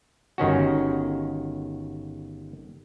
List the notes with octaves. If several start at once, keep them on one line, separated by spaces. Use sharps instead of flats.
G1 D#3 C#4 F#4